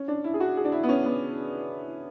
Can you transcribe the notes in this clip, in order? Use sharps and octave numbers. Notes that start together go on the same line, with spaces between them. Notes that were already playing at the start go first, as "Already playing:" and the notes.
Already playing: C#4
D4
E4
G#4
F#4
G#4
D4
E4
B3
C#4
B3